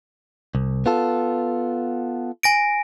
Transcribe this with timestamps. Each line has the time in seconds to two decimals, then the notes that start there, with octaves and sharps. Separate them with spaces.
0.55 C2
0.86 B3 F4 A4
2.43 G#5 A#6 D7